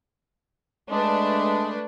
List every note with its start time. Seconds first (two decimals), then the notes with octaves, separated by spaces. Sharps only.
0.90 G#3 A3 D4 B4